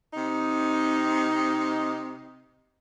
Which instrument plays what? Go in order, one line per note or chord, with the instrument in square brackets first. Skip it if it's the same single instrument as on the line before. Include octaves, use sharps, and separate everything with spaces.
[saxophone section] C3 D#4